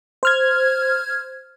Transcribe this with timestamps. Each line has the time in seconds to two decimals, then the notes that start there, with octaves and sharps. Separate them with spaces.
0.23 C5 F6 G#6